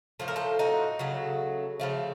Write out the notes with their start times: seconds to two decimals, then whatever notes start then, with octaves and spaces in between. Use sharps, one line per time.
0.20 A2 F3 A3 C5
0.28 A#4
0.36 A4 C5
0.59 D#4 F#4
0.99 C#3 F#3 A3
1.80 C#3 F3 A3